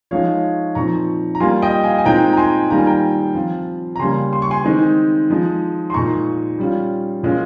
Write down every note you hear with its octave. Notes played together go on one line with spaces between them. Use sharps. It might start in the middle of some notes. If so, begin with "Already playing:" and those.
F3 G#3 D#4 C#5 F5
A#2 F3 C4 D#4 A#5 C#6
A#5
G3 A#3 F4 G#5 C6
D#5 G5
F5 G#5
G#5
A#2 G#3 C4 D#4 G5 A#5
A#5
G#5 C6
D#3 G3 A#3 F4 A#5
G#5
G5 A#5
F3 C4 F4
A#5
C#3 G3 A#3 G#5 C6
C6
C#6
G#5 C6
D#3 G#3 C4 D#4
F3 G#3 D#4
C6
A#2 G#3 D#4 A#5 C#6
G3 C#4 F4
A#2 G#3 C#4 F4